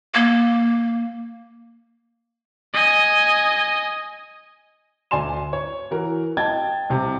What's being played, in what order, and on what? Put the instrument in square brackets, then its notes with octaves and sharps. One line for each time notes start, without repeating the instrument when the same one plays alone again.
[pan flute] A#3
[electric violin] D#5 G#5
[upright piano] D2 D5 G#5 C6 E7
C#5
E3 F#4 A#4
D#5 G5 A5 G#6 A6
C2 C3